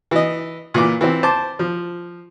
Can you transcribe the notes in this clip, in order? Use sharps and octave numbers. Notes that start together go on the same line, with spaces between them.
E3 D#5
A#2 E3 D6
E3 C4
C5 A5 D6
F3